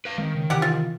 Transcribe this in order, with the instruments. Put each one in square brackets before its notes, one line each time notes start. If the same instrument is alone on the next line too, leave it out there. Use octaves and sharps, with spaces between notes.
[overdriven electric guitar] B4 F5
[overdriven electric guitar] D#3 [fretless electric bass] G#3 C4
[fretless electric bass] C#3
[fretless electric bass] C3 E3 [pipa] G4 F#5
[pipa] F4